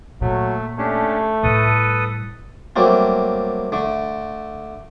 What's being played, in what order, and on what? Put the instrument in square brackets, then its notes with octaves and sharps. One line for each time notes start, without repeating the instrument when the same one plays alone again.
[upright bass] A#2 [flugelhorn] F#3 [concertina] A3
[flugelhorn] A3 [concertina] C#4 D4 G4
[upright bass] A2 G3 [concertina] A4 B4 D#6
[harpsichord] F#3 G3 A3 A#3 C4
D3 A3